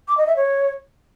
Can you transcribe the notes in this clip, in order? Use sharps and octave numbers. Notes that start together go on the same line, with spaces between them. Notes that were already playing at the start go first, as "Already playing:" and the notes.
D6
D#5
E5
C#5